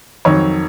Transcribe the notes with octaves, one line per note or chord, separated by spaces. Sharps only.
F2 D#3 F#3 C#5